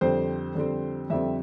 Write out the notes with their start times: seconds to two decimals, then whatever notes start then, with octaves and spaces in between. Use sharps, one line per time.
0.01 F2 D3 G3 C4 C5
0.55 F2 D3 G3 C4
1.10 F2 D3 G3 C4 E5